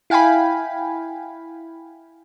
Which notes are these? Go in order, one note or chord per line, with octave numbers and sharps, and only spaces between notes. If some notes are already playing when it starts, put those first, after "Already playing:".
E4 F5 G5 G#5 B5